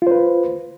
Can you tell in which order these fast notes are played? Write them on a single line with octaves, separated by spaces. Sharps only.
F4 C5 B4